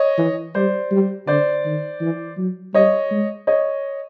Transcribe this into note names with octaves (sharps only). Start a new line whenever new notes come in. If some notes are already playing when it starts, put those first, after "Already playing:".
Already playing: C#5 D#5
E3
G3 C5 D5
G3
D3 C5 D5
D#3
E3
F#3
G3 C#5 D#5
G#3
C#5 D#5